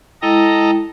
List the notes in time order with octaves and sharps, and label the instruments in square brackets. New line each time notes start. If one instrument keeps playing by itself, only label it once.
[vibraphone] G#3 E4 G5 [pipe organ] A4 D#5 A#5